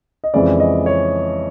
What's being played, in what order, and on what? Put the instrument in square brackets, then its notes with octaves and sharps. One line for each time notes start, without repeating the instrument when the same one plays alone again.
[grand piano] D#5
F2 C#3 E3 G#3 D5
D#5
C#5